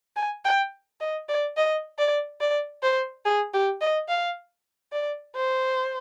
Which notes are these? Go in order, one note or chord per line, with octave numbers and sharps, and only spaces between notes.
G#5
G5
D#5
D5
D#5
D5
D5
C5
G#4
G4
D#5
F5
D5
C5